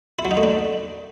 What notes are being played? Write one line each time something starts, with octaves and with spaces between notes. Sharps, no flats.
E4
F#3
D#4
A3
D4